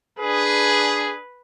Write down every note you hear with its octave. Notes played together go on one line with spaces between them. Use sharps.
D4 G#4 B4